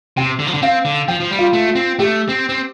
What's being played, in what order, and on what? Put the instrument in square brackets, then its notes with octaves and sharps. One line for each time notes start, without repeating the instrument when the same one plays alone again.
[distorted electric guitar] C3 [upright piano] G5
[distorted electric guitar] D3
F3
D3
[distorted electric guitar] C4 [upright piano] F5
[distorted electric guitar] D3
[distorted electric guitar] F3 [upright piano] G5
[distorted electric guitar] F3
G3
[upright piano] F4
[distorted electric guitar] A3
[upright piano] F4
[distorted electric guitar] C4
[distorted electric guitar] A3 [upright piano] G4
[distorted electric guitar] C4
C4